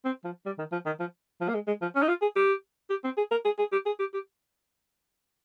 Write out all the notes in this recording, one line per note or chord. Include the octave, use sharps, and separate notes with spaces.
C4
F3
G3
D#3
F3
D#3
F3
F3
A#3
G#3
G#3
F3
C#4
D#4
F4
G#4
G4
G4
C4
G#4
A#4
G#4
G#4
G4
G#4
G4
G4